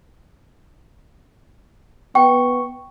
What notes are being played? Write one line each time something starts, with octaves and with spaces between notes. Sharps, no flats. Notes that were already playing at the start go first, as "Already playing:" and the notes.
B3 G5 C#6